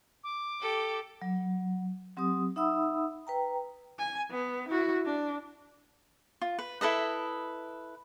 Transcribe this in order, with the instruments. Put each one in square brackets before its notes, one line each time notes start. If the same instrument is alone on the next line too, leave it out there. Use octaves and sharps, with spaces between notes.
[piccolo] D6
[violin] G4 A4
[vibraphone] F#3
F#3 C4 G4 D#6
D#4 E5 F#5 B5 D#6 E6
B4 G5 A#5
[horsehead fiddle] G#5
B3
E4 F#4
D4
[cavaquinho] F4
B4
E4 A4 B4 D#5